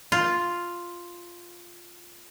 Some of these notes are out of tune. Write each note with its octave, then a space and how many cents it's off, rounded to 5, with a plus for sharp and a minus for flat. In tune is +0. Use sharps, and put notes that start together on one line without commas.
F4 +0